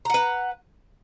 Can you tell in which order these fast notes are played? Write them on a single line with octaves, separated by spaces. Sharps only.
A#5 F#5 B4